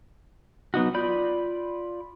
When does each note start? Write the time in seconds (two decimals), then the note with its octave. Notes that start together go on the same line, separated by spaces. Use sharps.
0.74 F#3 B3 D#4 F#4
0.94 F4 D5 B5 G6